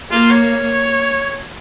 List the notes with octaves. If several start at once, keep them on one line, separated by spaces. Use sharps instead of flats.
A#3 F4
C#5